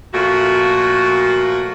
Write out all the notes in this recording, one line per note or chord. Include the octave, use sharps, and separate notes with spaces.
A#2 F3 A3 F#4